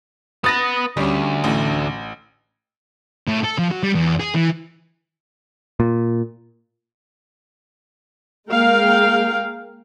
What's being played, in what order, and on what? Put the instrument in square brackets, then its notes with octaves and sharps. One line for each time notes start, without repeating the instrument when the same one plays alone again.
[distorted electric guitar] B3 B4 [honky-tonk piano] D#6 A6 A#6
[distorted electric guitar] D2 [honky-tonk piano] G3 C#4
[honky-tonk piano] A1
[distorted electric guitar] A2
A4
F3
F#3
G3
E2
G#4
E3
[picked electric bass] A#2
[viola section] G#3 A#3 G#4 A#4 F5 G5